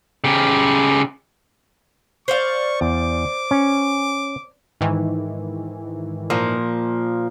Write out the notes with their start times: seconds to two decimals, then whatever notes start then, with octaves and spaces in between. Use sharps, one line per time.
0.24 C#3 G4
2.28 C5 D5 F5 C#6
2.81 E2 D6
3.51 C#4
4.81 G#2 D#3 E3
6.30 A#2 F3 A#3